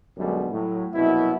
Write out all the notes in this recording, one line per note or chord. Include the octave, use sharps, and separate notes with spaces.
B1 F#2 B2 D3 G3 G#3
A2 F#3
C2 F#2 B2 E4